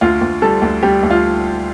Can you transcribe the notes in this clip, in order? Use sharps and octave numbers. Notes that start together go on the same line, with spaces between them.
D2 F4
D2
G3 A4
D2
G3 G4
D2
F4